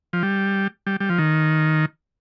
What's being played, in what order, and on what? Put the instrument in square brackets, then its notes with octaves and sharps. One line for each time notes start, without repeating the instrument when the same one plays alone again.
[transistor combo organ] F3
G3
G3
G3
F3
D#3